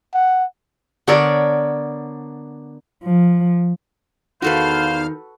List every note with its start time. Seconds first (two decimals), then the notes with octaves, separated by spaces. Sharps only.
0.14 F#5
1.07 D3 B3 A4 A#4 C#5 D5
3.03 F3
4.42 E2 D#3 F#4 A4 B4 C5 F5 F6